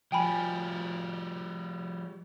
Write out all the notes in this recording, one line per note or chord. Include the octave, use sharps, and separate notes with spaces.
F3 G3 G5 G#5 B5